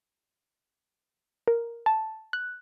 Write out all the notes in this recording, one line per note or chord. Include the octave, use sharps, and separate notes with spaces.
A#4
A5
F#6